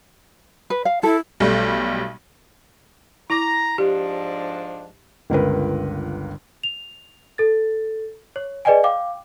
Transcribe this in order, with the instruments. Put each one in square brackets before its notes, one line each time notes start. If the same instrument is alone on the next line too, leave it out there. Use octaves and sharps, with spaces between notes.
[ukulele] B4
F5
[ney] E4 [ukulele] A4
[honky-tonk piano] B1 G3 A3
[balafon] E4 D6 [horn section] A#5
[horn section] G#2 F3 D4 [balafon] G4
[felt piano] G1 C#2 A#4 B4
[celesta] F7
A4 A6
C#5
G#4 B4 D5 D#5 G5 G#5
F5 G5 D6